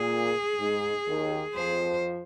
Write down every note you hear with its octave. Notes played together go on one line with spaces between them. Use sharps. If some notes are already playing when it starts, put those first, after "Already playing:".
Already playing: A#2 G#4
G#2
D#2 D#3
F2 F3 C5